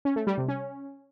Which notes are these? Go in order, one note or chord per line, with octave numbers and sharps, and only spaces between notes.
C#4
A3
G3
C3
C#4